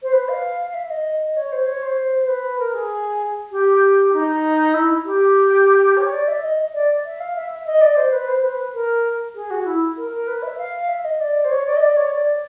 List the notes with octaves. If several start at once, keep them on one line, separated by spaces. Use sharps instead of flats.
C5
B4
F5
F5
E5
D#5
C#5
C5
C#5
C5
C5
B4
A#4
G#4
G4
D#4
E4
G4
C#5
D5
E5
D#5
D5
E5
F5
E5
E5
D#5
D5
C5
B4
C5
B4
A#4
G#4
F#4
E4
A#4
A#4
B4
E5
F5
E5
D#5
D5
C5
C#5
D5
D#5
D5
C#5
D5